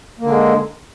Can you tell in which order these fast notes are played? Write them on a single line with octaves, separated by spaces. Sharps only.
A#3 D3 G#3